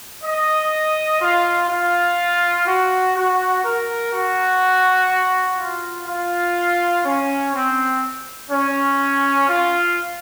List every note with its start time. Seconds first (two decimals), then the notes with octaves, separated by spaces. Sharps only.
0.24 D#5
1.21 F4
1.70 F4
2.67 F#4
3.15 F#4
3.64 A#4
4.13 F#4
5.58 F4
6.07 F4
7.05 C#4
7.53 C4
8.51 C#4
9.48 F4